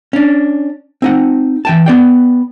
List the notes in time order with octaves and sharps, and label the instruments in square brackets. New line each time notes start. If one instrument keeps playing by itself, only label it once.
[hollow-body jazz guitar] C#4 D4
C4 D#4 F#5
E3 G5 A5
B3 D5 G5